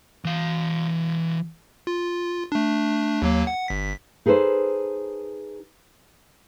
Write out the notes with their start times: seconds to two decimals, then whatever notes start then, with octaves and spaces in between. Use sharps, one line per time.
0.25 E3 F5
1.87 F4
2.52 A3 D4
3.22 D#2 F#3 A#3
3.47 F#5
3.68 G1 B6
4.26 D#4 G#4 A4 B4 C5